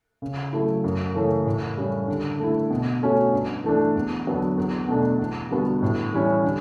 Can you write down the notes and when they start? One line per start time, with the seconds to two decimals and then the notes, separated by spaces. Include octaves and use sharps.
0.22 C#3
0.53 F#3 A3 E4
0.84 F#2
1.15 C#3 E3 A3 C#4
1.46 A2
1.77 G3 C#4
2.08 D3
2.39 A3 E4
2.70 B2
3.02 A3 C#4 F#4
3.32 G2
3.64 E3 A3 D4
3.96 E2
4.26 D3 F#3 B3 D4
4.57 E2
4.88 B2 A3 D4
5.19 E2
5.51 D3 G3 B3 F#4
5.83 A2
6.13 E3 G3 C#4
6.45 D3